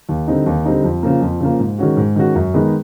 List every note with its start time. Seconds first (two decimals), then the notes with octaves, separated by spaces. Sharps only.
0.09 D#2
0.27 D3 G3 C4 D#4
0.46 D#2
0.65 D3 G3 C4 D#4
0.84 F2
1.03 C#3 F3 A#3
1.22 F2
1.40 C#3 F3 A#3
1.59 G#2
1.79 D#3 G#3 C#4 F#4
1.97 G#2
2.16 D#3 G#3 C#4 F#4
2.35 F#2
2.54 D#3 G#3 B3 D#4